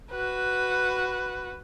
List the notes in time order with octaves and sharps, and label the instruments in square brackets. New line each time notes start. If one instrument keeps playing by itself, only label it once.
[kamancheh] F#4 B4